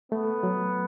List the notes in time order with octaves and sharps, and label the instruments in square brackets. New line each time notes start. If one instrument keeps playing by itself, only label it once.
[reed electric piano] A3 [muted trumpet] B3
[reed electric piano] F#3